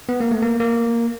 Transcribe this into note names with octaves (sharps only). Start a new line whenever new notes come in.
B3
A#3
A3
A#3
A#3